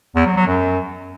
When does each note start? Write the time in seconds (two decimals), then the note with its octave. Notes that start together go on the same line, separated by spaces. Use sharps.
0.16 E2
0.26 F#3
0.37 F#3
0.47 F#2